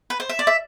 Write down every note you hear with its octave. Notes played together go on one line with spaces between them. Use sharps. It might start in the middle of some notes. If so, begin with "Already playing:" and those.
B4
C5
E5
D5
E5